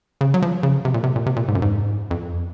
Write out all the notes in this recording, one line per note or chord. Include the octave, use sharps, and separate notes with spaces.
C#3
F#3
F3
C#3
C3
A#2
C3
A#2
C3
A#2
G#2
F#2
G#2
F2